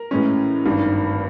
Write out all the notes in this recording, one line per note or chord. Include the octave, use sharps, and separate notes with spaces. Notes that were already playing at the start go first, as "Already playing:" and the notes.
Already playing: A#4
A2 E3 G#3 C#4
G#1 G2 D#3